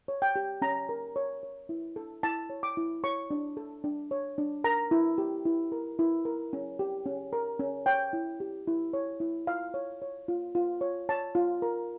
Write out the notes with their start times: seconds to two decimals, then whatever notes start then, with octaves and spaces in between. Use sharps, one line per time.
0.08 C#5
0.22 G5
0.36 G4
0.62 C#4 A#5
0.89 A#4
1.16 C#5
1.43 C#5
1.69 E4
1.96 A4
2.23 E4 A5
2.50 C#5
2.63 D6
2.77 E4
3.04 C#5 C#6
3.31 D4
3.57 A4
3.84 D4
4.11 C#5
4.38 D4
4.64 A#4 A#5
4.91 E4
5.18 G4
5.45 E4
5.72 A#4
5.99 E4
6.25 A#4
6.53 C#4
6.79 G4
7.06 C#4
7.33 A#4
7.60 C#4
7.86 C#5 G5
8.13 E4
8.40 G4
8.67 E4
8.93 C#5
9.20 E4
9.47 F4 F5
9.74 C#5
10.02 C#5
10.28 F4
10.55 F4
10.81 C#5
11.09 C#5 A5
11.35 F4
11.62 A#4